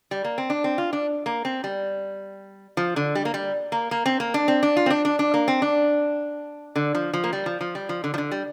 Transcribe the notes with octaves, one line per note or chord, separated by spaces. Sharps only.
G3
A#3
C4
D4
C4
F4
D4
A#3
C4
G3
F3
D3
G3
A#3
G3
A#3
A#3
C4
A#3
D4
C4
D4
F4
C4
D4
D4
D4
A#3
C4
D4
D3
F3
F3
A#3
G3
F3
F3
G3
F3
D3
F3
D3
G3